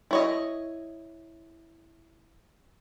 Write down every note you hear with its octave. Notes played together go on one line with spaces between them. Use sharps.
E4 C#5 D#5